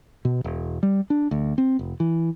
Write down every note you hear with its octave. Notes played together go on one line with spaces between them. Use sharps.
B2
E1
G3
D4
D2
C4
F1
E3